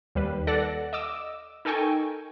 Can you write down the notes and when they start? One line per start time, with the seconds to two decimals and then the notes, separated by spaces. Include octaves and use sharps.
0.15 D#2 G3 B4
0.47 A4 D5 F#5 A#6
0.93 D#5 D6 E6
1.65 D#4 A4 A#4 G5 G#5 C#6